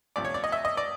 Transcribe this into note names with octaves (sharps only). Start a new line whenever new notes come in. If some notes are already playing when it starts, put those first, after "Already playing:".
D2 C3 F3 D5
C#5
D5
D#5
E5
D#5
D5